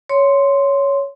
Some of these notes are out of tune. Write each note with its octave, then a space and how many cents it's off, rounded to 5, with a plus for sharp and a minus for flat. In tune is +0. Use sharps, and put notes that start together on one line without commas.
C#5 +5 C6 -5